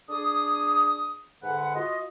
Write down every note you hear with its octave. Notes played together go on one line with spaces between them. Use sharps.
D4 G#4 D#6
G#2 D3 B4 F#5
F4 F#4 D#5